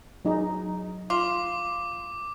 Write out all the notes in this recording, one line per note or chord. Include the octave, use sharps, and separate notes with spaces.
F#3 D#4 G#4
F4 D6